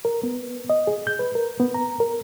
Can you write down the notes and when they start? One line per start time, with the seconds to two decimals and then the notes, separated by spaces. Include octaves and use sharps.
0.05 A#4
0.23 B3
0.70 D#5
0.87 G#4
1.07 G6
1.19 B4
1.35 A#4
1.60 B3
1.74 A#5
2.00 A#4